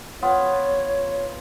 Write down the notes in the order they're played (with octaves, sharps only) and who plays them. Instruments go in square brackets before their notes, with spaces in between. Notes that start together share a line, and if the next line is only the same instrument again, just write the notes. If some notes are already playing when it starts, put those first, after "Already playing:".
[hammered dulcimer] B3 F4 [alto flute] C#5